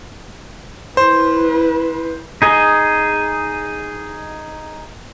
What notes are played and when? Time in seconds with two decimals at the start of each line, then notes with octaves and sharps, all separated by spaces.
0.97 E4 B4 C5
2.42 D#4 G#4 D#5